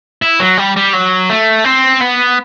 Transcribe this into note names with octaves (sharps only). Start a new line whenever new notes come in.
E4
F#3
G3
G3
F#3
A3
C4
B3